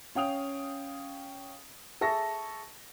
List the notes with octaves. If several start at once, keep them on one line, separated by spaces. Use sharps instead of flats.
C#4 F5 G5 D#6 F7
G#4 A4 E5 C#6 A#6